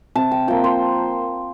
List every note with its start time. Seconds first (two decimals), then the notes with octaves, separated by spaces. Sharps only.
0.15 C3 A5
0.32 G5
0.48 F3 A#3 G5
0.64 C5